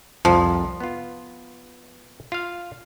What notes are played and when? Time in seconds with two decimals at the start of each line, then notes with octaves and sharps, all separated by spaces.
0.25 C2 F2 F3
0.80 B3 F4
2.32 F4 F5